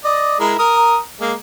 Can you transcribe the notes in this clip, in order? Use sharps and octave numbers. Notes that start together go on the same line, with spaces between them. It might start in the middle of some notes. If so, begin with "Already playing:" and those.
D5 D#5
G#3 E4 A#4
A#4 D#6
G#3 A#3